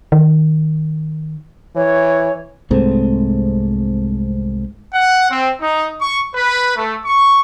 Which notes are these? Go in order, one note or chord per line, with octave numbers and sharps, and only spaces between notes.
D#3
E3 C#5
C2 G#2 A3 C4
F#5
C4
D#4
C#6
B4
A3
C#6